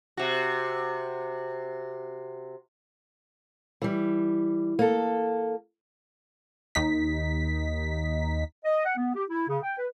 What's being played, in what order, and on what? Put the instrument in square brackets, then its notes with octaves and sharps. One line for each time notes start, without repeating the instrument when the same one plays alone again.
[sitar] C3 F#4
[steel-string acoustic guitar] E3 G3
A#3 A4
[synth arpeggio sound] D#2 D#4 B6
[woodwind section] D#5
F#5
B3
G4
E4
C#3
G5
B4